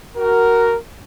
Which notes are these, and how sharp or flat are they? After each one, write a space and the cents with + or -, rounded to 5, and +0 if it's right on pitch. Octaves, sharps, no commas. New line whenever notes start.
F#4 +15 A#4 +0